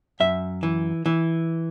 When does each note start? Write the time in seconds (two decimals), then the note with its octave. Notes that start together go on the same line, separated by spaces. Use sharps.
0.20 F#2 E5
0.63 E3
1.06 E3